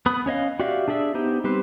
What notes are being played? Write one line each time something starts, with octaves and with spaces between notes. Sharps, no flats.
B3 B5 D#6
C#4 C#5 D#5 F5
F#4 G4 D5 E5 F5
D4 G#4 D5 E5 E6
B3 D#4 G4 C5
G3 C4 G4 B4 C5